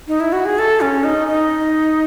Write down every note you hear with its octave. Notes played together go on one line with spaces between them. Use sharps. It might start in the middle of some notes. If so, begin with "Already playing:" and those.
D#4
E4
F#4
G#4
A4
C#4
D#4
D#4